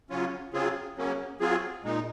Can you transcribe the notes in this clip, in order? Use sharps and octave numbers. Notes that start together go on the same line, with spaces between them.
C#3 F#3 C#4 F4
C#3 F#3 C4 F4 G#4
C#3 F#3 A#3 C#4
F#3 C4 F4 G#4
A#2 G#3 D#4